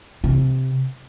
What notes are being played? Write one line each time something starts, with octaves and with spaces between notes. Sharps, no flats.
C3